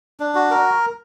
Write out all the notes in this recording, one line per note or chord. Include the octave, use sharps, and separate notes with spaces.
D4
F#4
A#4